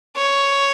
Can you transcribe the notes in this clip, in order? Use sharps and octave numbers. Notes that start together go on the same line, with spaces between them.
C#5